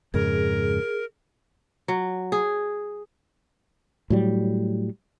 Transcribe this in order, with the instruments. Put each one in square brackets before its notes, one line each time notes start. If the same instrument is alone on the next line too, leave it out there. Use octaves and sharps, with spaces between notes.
[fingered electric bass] F2 G#2 C#3 [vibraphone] G#4 [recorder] A#4
[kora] F#3
G#4
[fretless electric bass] A2 F#3 G3